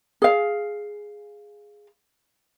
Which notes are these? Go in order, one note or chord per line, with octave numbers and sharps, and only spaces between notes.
G#4 F5